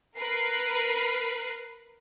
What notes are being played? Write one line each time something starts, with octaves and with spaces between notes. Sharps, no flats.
A#4 B4 C7